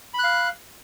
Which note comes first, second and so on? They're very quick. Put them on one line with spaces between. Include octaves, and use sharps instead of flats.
B5 F#6 F5